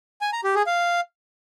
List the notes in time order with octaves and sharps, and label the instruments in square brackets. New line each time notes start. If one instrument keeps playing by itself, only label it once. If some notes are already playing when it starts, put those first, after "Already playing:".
[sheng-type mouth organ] G#5
A#5
G4
G#4
F5